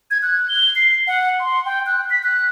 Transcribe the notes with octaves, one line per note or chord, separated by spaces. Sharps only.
G#6
F#6
G7
C7
F#5
C6
G5
F#6
B6
F#6